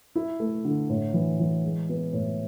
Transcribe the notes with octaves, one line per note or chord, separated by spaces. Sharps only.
E4
A3
D3
A2
E3
E3
G#3
B3
A2